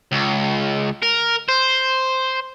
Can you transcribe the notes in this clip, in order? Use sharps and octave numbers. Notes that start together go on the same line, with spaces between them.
C#2
A#4
C5